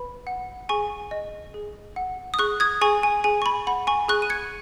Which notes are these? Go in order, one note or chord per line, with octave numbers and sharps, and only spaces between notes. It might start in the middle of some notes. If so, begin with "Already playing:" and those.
Already playing: B4 B5
F#5
G#4 G#5 C#6
D#5
G#4
F#5
D#6
G#4 C#6 F#6
D#6 G#6
G#4 G#5 C#6
G#5
G#4 G#5
C#6
B5
F#5 B5
G#5 C#6
G#4 C#6 F#6
D#7
G#6 C#7